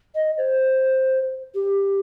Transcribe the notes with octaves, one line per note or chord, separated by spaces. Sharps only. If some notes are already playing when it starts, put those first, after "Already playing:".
D#5
C5
G4